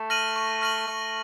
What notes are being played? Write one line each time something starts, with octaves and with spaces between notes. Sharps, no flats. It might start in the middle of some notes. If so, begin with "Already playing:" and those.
Already playing: A3
F6 A#6 D#7 F#7
C#6
F6 A#6 D#7 F#7
A3 C#6